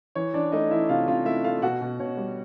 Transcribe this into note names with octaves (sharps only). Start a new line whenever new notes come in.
E3 C#5
E3 D4 D5
A3 D#4 D#5
E3 E4 E5
C3 F4 F5
C3 F4 F5
A3 E4 E5
A3 F4 F5
B2 F#4 F#5
B2
B2 C#5
G3